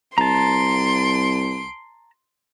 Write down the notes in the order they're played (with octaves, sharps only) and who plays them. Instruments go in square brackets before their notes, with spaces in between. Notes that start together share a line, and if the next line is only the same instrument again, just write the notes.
[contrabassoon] C2 [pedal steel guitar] A5 A#5 [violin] C6 D7